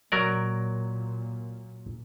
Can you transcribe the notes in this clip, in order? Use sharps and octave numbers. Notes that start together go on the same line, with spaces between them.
A#2 F#3 A#4 D5